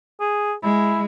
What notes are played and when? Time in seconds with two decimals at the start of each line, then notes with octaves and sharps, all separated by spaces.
0.20 G#4
0.63 G#3 E4